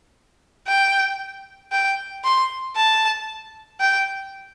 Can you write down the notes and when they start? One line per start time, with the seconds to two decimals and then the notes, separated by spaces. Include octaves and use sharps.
0.67 G5
1.72 G5
2.24 C6
2.76 A5
3.80 G5